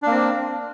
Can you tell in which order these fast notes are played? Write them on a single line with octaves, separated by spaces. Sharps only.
D4 A#3 C4